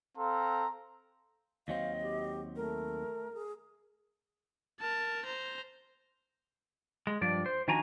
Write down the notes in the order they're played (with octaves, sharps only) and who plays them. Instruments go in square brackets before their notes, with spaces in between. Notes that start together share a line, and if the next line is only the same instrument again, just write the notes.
[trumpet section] C4 A4 F5 A#5 C6
[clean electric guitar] D#2 F#3 C4 [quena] D#5 [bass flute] F5
[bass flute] G4
[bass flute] A3 [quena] A#4
[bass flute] G#4
[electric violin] A#4 A5
C5 A#5
[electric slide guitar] G#3
G2 F3 D5
C5
D#3 F3 D4 F#4 G#5 A#5